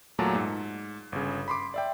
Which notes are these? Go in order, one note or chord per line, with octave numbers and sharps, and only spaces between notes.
E2 A#2 F#3 A3 A5 A#5
G#2
G1 C#3
B5 C6 D6
D5 E5 G5